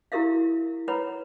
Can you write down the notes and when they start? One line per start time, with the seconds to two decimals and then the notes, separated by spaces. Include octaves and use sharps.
0.12 E4 F#4 G4 A#4 E5 F5
0.88 B4 C#5 F#5 A#5 B5